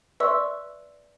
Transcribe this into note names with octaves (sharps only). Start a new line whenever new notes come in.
B4 D5 E5 C6 C#6 E6